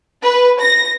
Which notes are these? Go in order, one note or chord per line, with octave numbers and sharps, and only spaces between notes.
B4
A#6